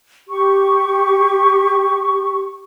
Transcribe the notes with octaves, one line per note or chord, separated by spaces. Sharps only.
G4 C#6